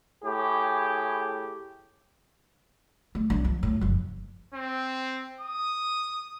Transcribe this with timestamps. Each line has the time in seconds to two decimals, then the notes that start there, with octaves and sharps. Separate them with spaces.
0.25 A2 G4 G#4
3.15 A3
3.30 B1 D4
3.44 F3
3.63 A2
3.81 F#1 F3
4.54 C4
5.41 D#6